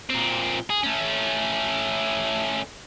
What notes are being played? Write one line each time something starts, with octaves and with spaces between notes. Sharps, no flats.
A#2 C4
G#4
A3 C#4